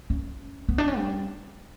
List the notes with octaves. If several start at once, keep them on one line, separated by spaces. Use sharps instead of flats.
C#4
B3
D4
C#4
G3